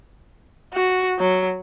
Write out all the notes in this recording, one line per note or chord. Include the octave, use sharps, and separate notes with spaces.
F#4
F#3